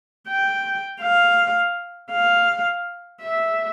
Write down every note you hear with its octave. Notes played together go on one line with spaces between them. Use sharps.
G5
F5
F5
E5